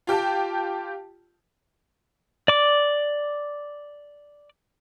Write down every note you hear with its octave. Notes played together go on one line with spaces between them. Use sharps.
F4 G4 G5 A5
D5 D6